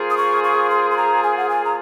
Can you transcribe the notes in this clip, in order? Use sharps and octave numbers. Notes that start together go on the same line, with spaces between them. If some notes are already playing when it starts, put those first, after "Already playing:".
Already playing: A#3 F4 G#4 C5
D#6
C#6
C#6
C6
C6
A#5
G#5
F#5
G#5
A#5